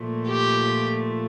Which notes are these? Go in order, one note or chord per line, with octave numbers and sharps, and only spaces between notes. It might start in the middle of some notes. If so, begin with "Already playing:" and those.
Already playing: A#2 F3 A3
G4